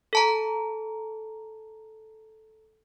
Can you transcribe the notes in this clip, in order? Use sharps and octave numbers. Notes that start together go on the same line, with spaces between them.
A4 A5 A#5